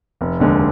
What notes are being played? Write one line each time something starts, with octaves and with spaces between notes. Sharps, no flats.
F1
D#2 D3 G#3